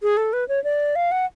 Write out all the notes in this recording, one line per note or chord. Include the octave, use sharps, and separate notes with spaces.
G#4
A4
B4
C#5
D5
F5
F#5